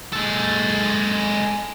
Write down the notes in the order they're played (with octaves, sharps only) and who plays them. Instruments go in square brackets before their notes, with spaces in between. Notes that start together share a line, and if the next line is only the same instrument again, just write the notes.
[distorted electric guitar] G#3 A4